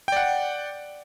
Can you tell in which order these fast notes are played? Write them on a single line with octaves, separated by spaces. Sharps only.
G5 D5 F#5